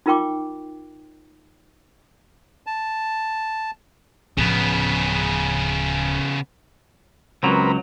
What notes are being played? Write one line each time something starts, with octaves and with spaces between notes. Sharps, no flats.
D#4 F4 A#4 G5 C#6 D6
A5
D1 C#3 F3 B3
C#2 F#3 C4 A#4 B4